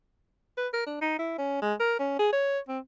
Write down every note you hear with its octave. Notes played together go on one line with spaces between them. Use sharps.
B4
A#4
D4
D#4
E4
C#4
G#3
A#4
C#4
G#4
C#5
C4